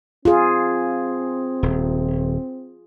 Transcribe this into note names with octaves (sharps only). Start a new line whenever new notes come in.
C4 F4 G#4
D#1